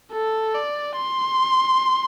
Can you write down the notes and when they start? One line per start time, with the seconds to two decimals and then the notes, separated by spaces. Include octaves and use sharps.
0.12 A4
0.54 D5
0.96 C6